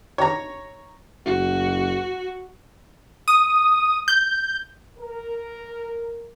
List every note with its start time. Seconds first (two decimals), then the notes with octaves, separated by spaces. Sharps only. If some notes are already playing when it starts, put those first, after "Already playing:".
0.18 C#5 A#5
1.26 F#1 F#4
3.28 D#6
4.08 G6
4.99 A#4